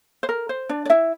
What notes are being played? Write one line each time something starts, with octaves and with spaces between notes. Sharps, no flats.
C5
A#4
C5
D4 D5
D5
E4 E5